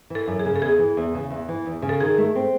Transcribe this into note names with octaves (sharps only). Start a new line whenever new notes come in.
E3 A4
F#2
G#4
C#3
A4
E2 G#4
E3
E2
C#3
E2
E3
E2
C#3
A4
D#3 G#4
A3
C4